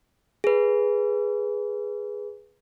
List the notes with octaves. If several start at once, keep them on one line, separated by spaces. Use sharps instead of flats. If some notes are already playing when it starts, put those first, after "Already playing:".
G#4 B4